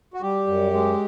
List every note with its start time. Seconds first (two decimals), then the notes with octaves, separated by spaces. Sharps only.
0.14 F#4
0.22 G3 G4
0.47 F#2
0.73 G#3